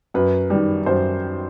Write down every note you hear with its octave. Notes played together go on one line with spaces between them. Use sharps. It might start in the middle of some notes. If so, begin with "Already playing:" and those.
F#2 B4
D#3 G3
F#2 C5